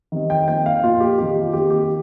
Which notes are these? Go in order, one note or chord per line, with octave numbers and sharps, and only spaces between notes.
D#3 G3 C4 D#4
G5
F3 A#3 D#4 G5
F5
A#2 A#3 D#4 F4
G4
D#3 C4 D#4 G4
F4
D#3 A#3 D#4 G4
G4